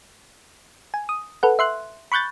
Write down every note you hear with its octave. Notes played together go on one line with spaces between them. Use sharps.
G#5
D#6
A4 B4 F#5
E5 C6 F#6
B5 C#6 F#6 G6 A6